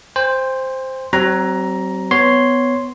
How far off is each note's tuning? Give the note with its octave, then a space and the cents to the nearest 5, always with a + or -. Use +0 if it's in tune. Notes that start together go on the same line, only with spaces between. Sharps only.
C5 +0 G5 +40
F#3 +45 C4 +0 A#5 +10
B3 +15 C#5 +0 C6 +0